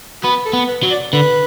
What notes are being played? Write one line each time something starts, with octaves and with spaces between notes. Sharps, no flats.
B3 F#4
A4
B3
B4
F#3
D5
D3 B4